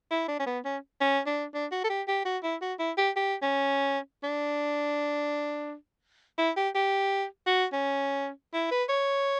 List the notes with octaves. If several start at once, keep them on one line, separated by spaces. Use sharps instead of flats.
E4
D4
C#4
B3
C#4
C#4
D4
D4
F#4
A4
G4
G4
F#4
E4
F#4
E4
G4
G4
C#4
D4
E4
G4
G4
F#4
C#4
E4
B4
C#5